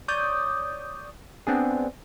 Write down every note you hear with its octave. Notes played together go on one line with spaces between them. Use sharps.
C#5 D5 D#6 G6
B3 C4 D4 G#4